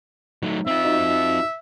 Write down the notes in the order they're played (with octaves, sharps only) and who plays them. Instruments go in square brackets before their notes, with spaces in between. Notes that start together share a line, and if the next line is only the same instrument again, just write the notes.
[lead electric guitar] F#3 A3 [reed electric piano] D#4
[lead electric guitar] C4 F4 [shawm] E5
[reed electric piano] D#4 F#4 D#5